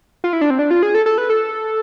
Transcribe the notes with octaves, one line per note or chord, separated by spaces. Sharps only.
F4
E4
D4
C4
D4
F4
G#4
A4
A4
B4
A4